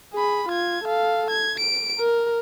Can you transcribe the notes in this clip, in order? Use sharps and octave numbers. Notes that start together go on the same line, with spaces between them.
G#4 B5
F4 G#6
A4 F5
G#6
D7
A#4